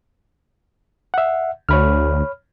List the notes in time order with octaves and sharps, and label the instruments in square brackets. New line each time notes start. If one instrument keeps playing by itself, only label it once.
[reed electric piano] E5 F#5
[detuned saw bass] D2 [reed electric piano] C#5 B5 F6